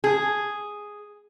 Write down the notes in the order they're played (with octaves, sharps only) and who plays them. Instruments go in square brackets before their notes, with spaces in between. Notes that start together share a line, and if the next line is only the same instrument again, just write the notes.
[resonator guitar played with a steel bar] G#4